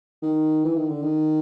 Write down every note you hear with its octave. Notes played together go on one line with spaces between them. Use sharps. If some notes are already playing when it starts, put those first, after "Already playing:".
D#3
E3
D#3
D3
D#3